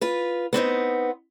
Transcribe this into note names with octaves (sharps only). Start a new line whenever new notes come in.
F4 B4
B3 C4 D4 D#4